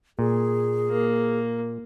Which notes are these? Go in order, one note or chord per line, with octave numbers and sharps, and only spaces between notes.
A#2 G#4
A#3